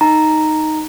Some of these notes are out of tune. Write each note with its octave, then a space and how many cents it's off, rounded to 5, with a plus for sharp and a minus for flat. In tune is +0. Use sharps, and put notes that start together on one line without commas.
D#4 +0 A#5 +0